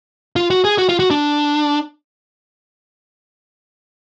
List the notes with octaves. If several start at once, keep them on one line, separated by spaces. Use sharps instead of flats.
F4
F#4
G#4
F#4
F4
F#4
D4